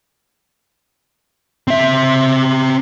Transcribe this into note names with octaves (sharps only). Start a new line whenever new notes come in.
C4 E5